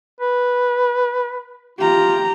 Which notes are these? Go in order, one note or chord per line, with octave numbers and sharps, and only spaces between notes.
B4
F4 G4 A#5